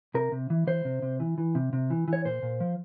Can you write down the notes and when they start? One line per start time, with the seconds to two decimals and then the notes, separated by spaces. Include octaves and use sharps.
0.14 C3 A#4
0.32 C3
0.50 E3
0.67 E3 C5
0.85 C3
1.02 C3
1.20 E3
1.38 E3
1.55 C3
1.73 C3
1.90 E3
2.08 E3
2.13 C#5
2.25 A#2 C5
2.43 A#2
2.60 F3